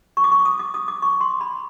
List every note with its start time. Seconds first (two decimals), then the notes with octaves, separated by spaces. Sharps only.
0.17 C#6
0.24 D6
0.32 C#6
0.45 D#6
0.59 D6
0.74 D#6
0.88 D6
1.02 C#6
1.21 C6
1.41 B5